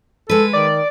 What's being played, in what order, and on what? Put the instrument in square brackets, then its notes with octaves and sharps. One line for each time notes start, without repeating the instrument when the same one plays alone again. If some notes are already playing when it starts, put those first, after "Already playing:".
[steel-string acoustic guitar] G#3 B4 [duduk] A4
[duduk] D#3 [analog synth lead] D5